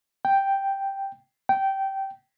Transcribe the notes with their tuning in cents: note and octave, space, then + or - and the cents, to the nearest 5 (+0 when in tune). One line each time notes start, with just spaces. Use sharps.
G5 +0
G5 -15